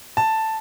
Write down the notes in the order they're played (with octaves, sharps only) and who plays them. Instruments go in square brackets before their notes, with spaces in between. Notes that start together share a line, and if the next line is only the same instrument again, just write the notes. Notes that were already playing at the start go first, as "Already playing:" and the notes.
[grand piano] A5